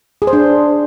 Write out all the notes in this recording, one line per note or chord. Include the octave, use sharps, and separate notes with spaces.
G#4
C5
D4